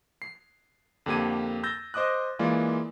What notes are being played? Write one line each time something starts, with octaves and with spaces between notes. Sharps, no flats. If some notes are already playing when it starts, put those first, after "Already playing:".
C7
F2 D3 A#3 G4 G#6 D#7
E6 G6 A6 A#6
C5 D#5 D6 D#6 F#6
E3 G#3 A#3 F4 D5